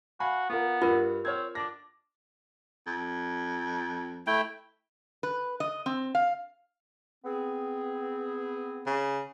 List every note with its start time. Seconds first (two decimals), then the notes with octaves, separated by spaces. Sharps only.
0.20 F#4 F5 G#5 B5
0.50 B3 F4 A#4
0.82 G2 F4 A#4
1.25 C4 C#5 F6 G#6
1.55 D4 D6 A#6
2.87 F2
4.27 A3 E4 G5
5.23 B4
5.60 D#5
5.86 C4
6.15 F5
7.25 B3 C4 G#4
8.86 C#3